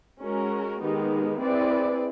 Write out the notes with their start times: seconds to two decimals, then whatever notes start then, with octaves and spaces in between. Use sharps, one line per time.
0.21 G#3 C#4 F#4 A#4
0.80 D#3 G#3 B3 D#4 G4
1.39 C4 E4 G#4 B4 D5